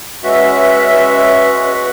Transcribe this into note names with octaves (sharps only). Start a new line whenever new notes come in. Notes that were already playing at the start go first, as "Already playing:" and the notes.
G#3 C#4 F#4 B4 E5